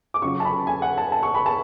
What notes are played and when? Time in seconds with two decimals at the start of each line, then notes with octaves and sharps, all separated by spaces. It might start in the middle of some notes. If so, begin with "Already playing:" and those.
0.14 D6
0.22 C#3 F#3 C#4 F4 C#6
0.40 A5
0.45 B5
0.67 G#5
0.82 F#5
0.98 A5
1.12 A5
1.23 C#6
1.34 B5
1.46 A5